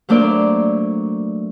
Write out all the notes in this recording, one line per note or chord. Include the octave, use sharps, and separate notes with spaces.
F#3 A3 A#3 D4 C5 D5